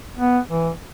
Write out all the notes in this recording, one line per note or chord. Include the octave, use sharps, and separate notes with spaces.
B3
E3